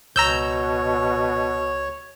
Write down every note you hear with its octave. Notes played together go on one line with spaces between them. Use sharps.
C#2 B2 C#5 A#5 E6 G6